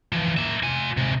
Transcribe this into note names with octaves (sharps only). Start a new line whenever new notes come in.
E3 F3
A#3 E5
F4 G#5
C3 G#3